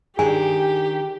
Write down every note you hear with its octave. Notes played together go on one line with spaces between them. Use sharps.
D#3 D4 G4 G#4 G#5